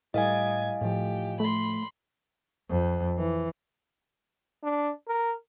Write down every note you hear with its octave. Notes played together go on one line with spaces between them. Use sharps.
A2 E3 G3 D#5 F5 G#5 D#6 G#6
A2 F3 G4
A3 B5 C6
F2
E3
D4
A#4